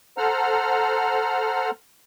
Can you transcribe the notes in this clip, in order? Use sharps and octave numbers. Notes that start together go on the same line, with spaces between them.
A4 C5 F#5 A#5 F6